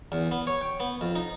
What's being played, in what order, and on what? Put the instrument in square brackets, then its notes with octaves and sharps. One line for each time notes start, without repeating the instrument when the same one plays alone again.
[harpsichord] E2
B3
C#5
G5
B3
F2
D#4